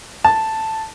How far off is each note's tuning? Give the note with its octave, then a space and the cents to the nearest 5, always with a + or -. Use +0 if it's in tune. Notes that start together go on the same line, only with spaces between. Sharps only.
A5 +5